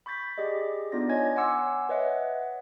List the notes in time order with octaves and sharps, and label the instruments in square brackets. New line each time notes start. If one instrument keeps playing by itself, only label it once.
[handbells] B5 C#6 G6 A6 B6
G4 G#4 D5 D#5
B3 D4 D#4 F4 D5 A#6
C#5 D#5 G#5 G#6
F#5 G#5 C6 D6 E6 C#7
B4 C#5 D#5 E5 F#5